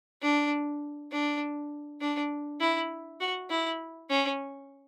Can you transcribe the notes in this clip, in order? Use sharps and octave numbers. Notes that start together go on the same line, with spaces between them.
D4
D4
D4
E4
F#4
E4
C#4